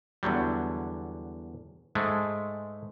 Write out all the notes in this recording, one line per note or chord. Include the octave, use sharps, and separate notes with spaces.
E2 D3 F#3 G3
G#2 G#3 A3